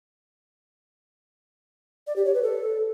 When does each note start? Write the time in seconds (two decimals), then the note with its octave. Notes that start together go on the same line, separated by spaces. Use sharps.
2.07 D5
2.16 G4
2.25 C#5
2.34 B4
2.43 A4